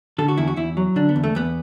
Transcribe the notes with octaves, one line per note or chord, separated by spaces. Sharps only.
D3 A4
F#4
E2 E4
F#4
E2 E4
F#3
D3 D4
B3
E2
A3
E2 B3